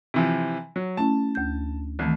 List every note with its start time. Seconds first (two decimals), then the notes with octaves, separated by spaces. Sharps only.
0.14 C3 E3 F3
0.76 F#3
0.97 A3 C#4 E4 A5
1.35 D2 G6
1.99 C2 D#3 E3 A3